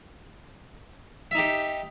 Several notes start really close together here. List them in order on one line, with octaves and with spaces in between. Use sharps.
E5 D#4 G4